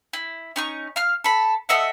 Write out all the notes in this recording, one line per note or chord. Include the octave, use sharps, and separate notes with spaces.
E4
C#4 D#4 C#6
F5 F6
A4 B5
A4 D#5 E5 F#5